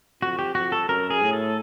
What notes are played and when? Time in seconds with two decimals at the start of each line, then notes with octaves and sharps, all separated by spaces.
0.22 F2 F#4
0.39 G4
0.55 F2 F#4
0.72 A4
0.89 F#2 A#4
1.10 G#4
1.22 A2
1.33 A4